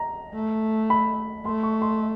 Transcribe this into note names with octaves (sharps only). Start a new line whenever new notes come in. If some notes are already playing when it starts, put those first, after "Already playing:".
Already playing: A#5
A3
B5
A3 C6
C#6
C6